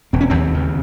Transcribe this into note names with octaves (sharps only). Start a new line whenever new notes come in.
E1 C4
C#4
D#2 C4
C#3